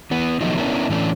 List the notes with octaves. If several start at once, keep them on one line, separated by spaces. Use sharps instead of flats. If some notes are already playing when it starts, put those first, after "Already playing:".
E3 B3
D#3 F3 F#3 A3 B3 D#4
B3 C#4 D4 E4 A#4
A2 E3 A3 C#4 D4